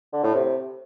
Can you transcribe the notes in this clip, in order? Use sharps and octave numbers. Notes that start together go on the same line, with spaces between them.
D3
A2
C3